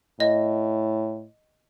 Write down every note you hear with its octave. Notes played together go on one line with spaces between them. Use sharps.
A2 D#5